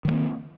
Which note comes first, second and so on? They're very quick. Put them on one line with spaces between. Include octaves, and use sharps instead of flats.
D#3 F#3 A#3 C4